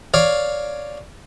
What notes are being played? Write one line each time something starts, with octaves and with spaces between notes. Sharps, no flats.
C#5 D5 F5